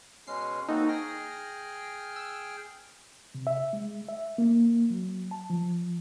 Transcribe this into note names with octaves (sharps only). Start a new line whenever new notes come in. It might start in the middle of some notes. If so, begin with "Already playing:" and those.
B2 G#3 C#4 C7
A#3 C4 D#4 F#4 A4
G#4 G5 F6 A#6
E6
C3
E5
G#3
E5
A#3
F#3
A5
F3